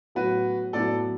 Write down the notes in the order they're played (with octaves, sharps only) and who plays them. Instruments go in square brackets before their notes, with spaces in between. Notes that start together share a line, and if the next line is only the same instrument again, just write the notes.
[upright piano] A2 F#3 B3 E4 [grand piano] F#4 B4
[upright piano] A2 F#3 B3 E4 [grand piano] A4 D5